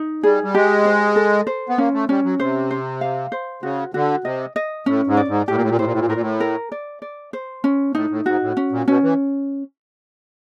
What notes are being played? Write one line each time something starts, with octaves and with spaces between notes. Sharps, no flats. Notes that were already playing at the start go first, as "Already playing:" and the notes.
Already playing: D#4
G3 G#4
G3
G#3 G4
C5
A4
C5
B3
A#3 C#4
A3
G3 C#4
F#3
C3 C5
C5
F5
C5
C#3 F#4
D3 F#4
C3 D#5
D#5
A2 C#4
G#2
D5
G#2
A2 G4
A#2
A2
A#2
A2 C5
A#2
A2
A#2
A2
A#2 A#4
A2
A#4
D5
D5
C5
C#4
A2 D#4
A2
G#2 F#4
A2
C#4
A#2
B2 C#4
E3